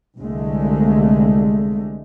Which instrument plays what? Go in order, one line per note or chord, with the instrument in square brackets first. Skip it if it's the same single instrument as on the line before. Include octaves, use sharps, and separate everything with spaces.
[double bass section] C2 D3 G#3 A3